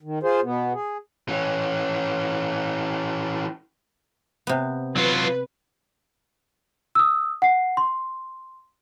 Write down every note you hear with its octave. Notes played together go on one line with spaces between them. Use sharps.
D#3
F4 G#4 C5
B2 B3
G#4
E3 C#4
C3 B3
F#3 F4 B4
D#6 E6
F#5 C7
C6